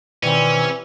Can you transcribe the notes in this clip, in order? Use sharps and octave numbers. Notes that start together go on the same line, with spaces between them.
B2 D#3 E3 G3 C4 C#4